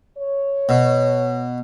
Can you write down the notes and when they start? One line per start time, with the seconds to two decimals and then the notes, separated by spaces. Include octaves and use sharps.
0.17 C#5
0.69 B2